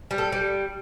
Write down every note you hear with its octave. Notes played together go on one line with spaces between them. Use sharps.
G3
A4
G3